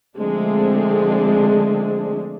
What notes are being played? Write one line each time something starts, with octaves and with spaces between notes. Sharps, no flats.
D3 F3 G#3 A3 C4 D4